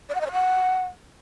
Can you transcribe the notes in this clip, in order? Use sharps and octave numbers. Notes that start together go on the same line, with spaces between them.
D5
F#5
D#5
C#5
F#5